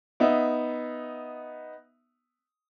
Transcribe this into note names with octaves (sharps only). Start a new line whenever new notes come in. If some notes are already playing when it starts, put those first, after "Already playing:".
B3 D#4 E5